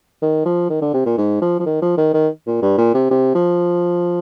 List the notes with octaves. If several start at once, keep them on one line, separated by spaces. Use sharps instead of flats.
D#3
F3
D#3
D3
C3
A#2
G#2
F3
F3
D#3
F3
D#3
D#3
A#2
G2
A#2
C3
C3
F3